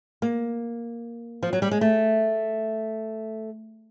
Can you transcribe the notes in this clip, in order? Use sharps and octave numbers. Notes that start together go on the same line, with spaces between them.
A#3
F3
F#3
G3
G#3
A3